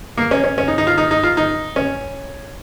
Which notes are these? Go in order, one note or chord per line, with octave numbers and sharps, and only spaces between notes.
A#3
C#4
C#4
C#4
D#4
D#4
F4
D#4
D#4
F4
D#4
C#4